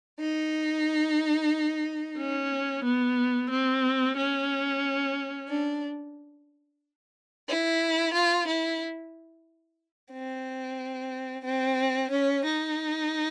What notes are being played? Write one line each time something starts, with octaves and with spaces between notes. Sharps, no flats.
D#4
C#4
B3
C4
C#4
D4
E4
F4
E4
C4
C4
C#4
D#4